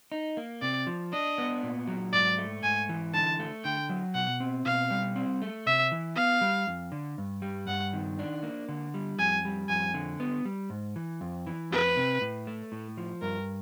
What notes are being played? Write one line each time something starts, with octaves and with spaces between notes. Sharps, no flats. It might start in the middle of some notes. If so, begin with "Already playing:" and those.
D#4
A#3
C3 D5
F3
D4 D#5
B3
A#2
F#3
G#2 D5
A3
G#2 G#5
E3
D3 A5
A3
D3 G5
F#3
B2 F#5
C4
B2 F5
G3
C4
A3
C3 E5
E3
B3 F5
G3
F2
D3
G2
G3
G2 F#5
D#3
D4
A#3
D3
G3
F2 G#5
G3
F2 G#5
D3
B3
G3
G#2
E3
F2
E3
F2 B4
C3
A2
A3
A2
F3
G2 A#4